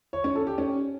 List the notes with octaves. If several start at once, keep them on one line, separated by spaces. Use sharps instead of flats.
C#5
C#4
A4
G4
C#4